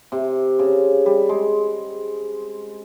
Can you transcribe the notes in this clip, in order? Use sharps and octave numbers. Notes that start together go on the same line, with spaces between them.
C3
C#3
G3
G#3